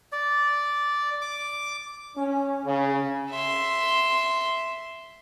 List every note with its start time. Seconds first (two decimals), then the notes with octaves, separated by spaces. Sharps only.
0.12 D5
1.22 D6
2.17 C#4
2.66 C#3
3.31 E5 C6